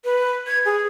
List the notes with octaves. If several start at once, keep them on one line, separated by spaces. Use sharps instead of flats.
B4
G#6
G#4